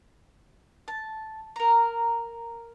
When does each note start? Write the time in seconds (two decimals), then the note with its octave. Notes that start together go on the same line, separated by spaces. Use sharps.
0.88 A5
1.56 A#4 A#5